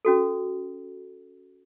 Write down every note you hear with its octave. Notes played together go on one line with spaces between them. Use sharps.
C#4 F#4 A4